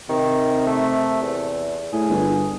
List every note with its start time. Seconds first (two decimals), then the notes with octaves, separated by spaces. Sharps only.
0.10 C3 D#3
0.67 A3
1.22 E2
1.93 A2 G#4
2.09 G1